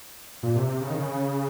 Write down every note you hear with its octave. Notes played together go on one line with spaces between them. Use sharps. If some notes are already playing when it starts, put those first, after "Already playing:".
A#2
C3
C3
C#3
D#3
C#3